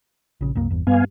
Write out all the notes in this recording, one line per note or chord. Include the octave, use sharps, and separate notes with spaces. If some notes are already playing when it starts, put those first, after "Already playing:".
A#1 C#3
C2 F#2 A#3
G1 E2
G2 G3 B3 F5 G#5